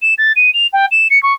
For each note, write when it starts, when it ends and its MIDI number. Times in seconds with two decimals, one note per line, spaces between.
0.02 0.14 100
0.18 0.32 93
0.36 0.50 99
0.53 0.67 101
0.73 0.85 79
0.91 1.08 100
1.10 1.21 97
1.22 1.33 85